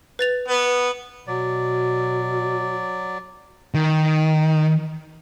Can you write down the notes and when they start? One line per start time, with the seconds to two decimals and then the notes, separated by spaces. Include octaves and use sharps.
0.19 B4 A6 F7
0.48 B3
1.27 B2 F#3 D5
3.74 D#3